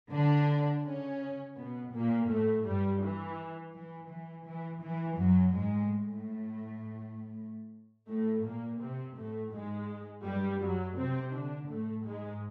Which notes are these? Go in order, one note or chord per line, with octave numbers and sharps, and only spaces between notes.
D3 D4
C#3 C#4
B2 B3
A#2 A#3
A2 A3
G2 G3
E3
E3
E3
E3
E3
F#2 F#3
G#2 G#3
A2 A3
A2 A3
A#2 A#3
C3 C4
A2 A3
G#2 G#3
G2 G3
F#2 F#3
C3 C4
D3 D4
A2 A3
G#2 G#3